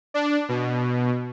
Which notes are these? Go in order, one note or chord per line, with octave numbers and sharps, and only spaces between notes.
D4
B2